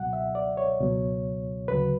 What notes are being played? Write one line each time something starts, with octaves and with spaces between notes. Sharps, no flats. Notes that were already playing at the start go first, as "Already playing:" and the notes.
Already playing: C#2 B2 F#3 F#5
E5
D5
C#5
C#2 B2 F#3
D2 C#3 F#3 B4